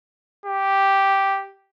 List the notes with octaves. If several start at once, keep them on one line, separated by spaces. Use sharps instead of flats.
G4